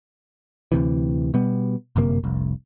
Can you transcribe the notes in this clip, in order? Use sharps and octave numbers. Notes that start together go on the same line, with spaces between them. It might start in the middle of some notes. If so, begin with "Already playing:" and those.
D2 C3 E3
B2 G3 B3
G1 F#2 C3 A#3
F1 C2